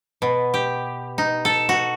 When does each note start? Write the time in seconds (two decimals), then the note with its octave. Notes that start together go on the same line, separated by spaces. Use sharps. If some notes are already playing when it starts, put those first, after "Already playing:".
0.22 B2
0.54 G4
1.18 D#4
1.45 A4
1.69 F#4